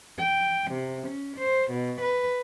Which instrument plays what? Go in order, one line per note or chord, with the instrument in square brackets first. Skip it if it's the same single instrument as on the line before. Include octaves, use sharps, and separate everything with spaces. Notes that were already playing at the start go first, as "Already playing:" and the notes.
[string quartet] G5
C3
C#4
C5
B2
B4